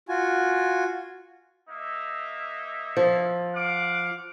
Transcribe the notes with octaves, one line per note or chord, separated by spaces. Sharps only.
F4 F#4 G#5
A#3 D#4 E5
F3
F5 F#5 D6